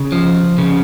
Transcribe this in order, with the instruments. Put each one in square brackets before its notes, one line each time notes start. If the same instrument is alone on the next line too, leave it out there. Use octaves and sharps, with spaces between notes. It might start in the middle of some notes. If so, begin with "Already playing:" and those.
Already playing: [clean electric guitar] C#3
F3
C#3